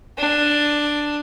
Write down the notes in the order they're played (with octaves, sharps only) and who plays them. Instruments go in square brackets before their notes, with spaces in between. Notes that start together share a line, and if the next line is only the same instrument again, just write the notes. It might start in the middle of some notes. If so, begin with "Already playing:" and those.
[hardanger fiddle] D4